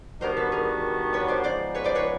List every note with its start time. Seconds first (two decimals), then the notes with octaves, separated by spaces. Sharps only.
0.21 D#3 G3 B3 D4 F#4 A#4 C5
0.37 A4 B4
0.52 G#4 A#4
1.13 B4 C#5
1.28 C5 D5
1.44 C#3 F3 G#3 B3 D#4 C5 D5
1.75 B4 C#5
1.84 C5 D5
1.95 B4 C#5